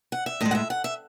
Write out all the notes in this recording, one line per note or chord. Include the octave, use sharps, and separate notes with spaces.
F#5
E5
A2 G#3 D#5
F#5
E5
F#5
E5